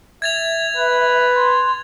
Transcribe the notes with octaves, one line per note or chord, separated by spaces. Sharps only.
E5 G#6 A6 F7
B4
C6